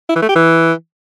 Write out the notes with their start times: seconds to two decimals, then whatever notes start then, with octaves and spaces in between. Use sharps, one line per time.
0.09 E4
0.16 E3
0.22 A3
0.29 G4
0.35 E3